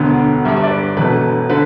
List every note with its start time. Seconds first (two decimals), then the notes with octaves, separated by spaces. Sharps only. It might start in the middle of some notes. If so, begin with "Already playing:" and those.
Already playing: E1 D2 D3 B3
0.45 G1 G2 G3 E5
0.57 E5
0.64 D5
0.71 B4
0.97 E1 E2 B2 A3 B4
1.50 D3 B4